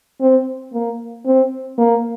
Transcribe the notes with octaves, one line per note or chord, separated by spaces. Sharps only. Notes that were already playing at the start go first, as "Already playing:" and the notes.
C4
A#3
C4
A#3